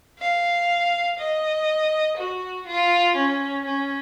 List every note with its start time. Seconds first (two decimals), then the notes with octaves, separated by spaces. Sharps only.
0.20 F5
1.19 D#5
2.17 F#4
2.67 F4
3.16 C#4
3.65 C#4